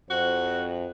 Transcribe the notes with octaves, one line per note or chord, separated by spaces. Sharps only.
F2 F#4 C5